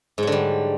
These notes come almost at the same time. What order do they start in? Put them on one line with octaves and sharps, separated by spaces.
G#2 F#3 D3 G3